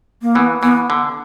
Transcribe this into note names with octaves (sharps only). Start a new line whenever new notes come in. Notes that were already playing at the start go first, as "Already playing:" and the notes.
A#3
E3 B3
E3 B3
D3